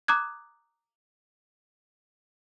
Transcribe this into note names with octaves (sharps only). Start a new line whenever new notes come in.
A#5 D6 D#6 F#6 G#6